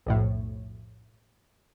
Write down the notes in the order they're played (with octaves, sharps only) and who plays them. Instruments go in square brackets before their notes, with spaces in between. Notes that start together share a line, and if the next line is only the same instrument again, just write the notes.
[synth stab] B1 F2 A2